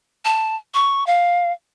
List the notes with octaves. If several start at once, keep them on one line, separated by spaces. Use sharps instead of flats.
A5
C#6
F5